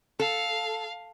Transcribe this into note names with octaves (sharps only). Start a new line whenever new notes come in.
A4 F5